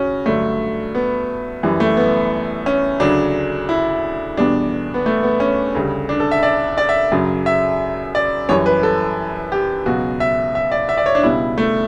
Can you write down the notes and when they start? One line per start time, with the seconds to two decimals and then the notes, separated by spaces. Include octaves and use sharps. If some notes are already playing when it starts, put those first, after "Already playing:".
Already playing: C#3 C#4 F#4
0.26 G2 D3 F#3 A3
0.95 B3
1.63 F#2 E3 G3
1.80 A3
1.97 B3
2.66 C#4
3.00 D2 C#3 F#3 D4
3.69 E4
4.37 E2 B2 G3 D4
4.94 B3
5.06 A3
5.23 B3
5.40 C#4
5.75 D2 C#3 G3
6.09 D4
6.20 A4
6.31 E5
6.43 D5
6.78 D5
6.89 E5
7.12 F#2 C#3 F#3
7.46 E5
8.15 D5
8.49 F#2 E3 G3 C#5
8.66 B4
8.83 A4
9.52 G4
9.86 C#2 B2 F#3 F#4
10.20 E5
10.55 E5
10.72 D5
10.89 E5
10.97 D5
11.06 C#5
11.15 D4
11.23 C#2 B2 G3 E4
11.58 A3